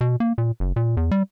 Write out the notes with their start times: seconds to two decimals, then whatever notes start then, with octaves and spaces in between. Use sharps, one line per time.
0.01 B2
0.20 A#3
0.38 A#2
0.60 F#1
0.76 A#2
0.97 E2
1.11 G3